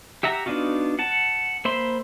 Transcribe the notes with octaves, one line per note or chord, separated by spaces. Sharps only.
G4 E5 F#5 A#5
B3 D4 D#4 F4 F#4
F#5 A5
A#3 C5 E5 B5 C6